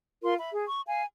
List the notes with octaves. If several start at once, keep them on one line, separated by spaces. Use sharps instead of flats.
F4 A#4 C6
E5 B5
G#4
C#6
F5 G#5